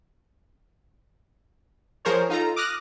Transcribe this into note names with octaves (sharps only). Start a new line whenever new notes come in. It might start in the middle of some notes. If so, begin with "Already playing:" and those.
F3 G#4 A#4 C5 C#5
D#4 F4 A4 A#5
D6 D#6 F6 F#6 A#6